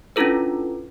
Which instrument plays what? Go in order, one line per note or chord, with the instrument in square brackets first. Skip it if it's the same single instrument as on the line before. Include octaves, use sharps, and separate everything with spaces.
[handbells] C#4 D4 E4 F4 A4 B4